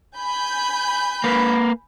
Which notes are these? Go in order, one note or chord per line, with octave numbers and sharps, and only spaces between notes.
G#5 B5 G6
A#3 B4